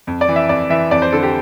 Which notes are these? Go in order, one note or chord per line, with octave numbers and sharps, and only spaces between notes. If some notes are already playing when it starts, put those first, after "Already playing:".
F2
D5
E3
E5
F2 D5
E3 E5
F2 D5
C5
D3 A4
G4